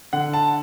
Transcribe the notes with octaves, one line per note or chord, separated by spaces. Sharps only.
D3 F#5
A5